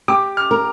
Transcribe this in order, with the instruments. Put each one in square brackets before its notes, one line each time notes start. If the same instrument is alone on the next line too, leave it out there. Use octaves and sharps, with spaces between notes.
[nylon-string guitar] G4 [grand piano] D6
[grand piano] F6
[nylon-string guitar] A#4